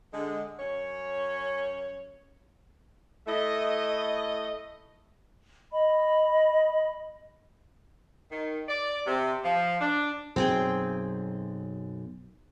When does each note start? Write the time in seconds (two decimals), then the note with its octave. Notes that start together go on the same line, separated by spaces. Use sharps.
0.13 D3 G#3
0.59 F#2 C#4 C#5
3.28 A3 E4 D#5
5.72 D#5 B5
8.31 D#3
8.69 D5
9.06 C3
9.45 F3
9.81 D4
10.36 B1 F#2 C4 G#4 G5